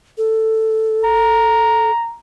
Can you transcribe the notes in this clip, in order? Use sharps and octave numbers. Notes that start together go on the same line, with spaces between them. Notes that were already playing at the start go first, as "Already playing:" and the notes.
A4
A#5